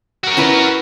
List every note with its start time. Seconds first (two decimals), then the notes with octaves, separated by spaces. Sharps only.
0.24 F#4 A#4
0.37 C#4 E4 B4